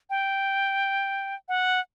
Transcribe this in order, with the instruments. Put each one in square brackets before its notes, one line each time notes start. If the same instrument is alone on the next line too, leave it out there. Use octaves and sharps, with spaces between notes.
[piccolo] G5
F#5